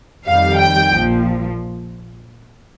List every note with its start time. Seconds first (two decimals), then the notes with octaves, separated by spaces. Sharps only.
0.25 F2 D#3 G3 F5
0.58 G5
0.92 A#1 A#2 F3